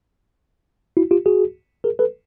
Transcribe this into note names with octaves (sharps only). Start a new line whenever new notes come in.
E4 F#4
F4 G4
F#4 G#4
G#4 A#4
A4 B4